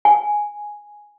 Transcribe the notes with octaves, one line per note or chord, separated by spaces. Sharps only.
G#5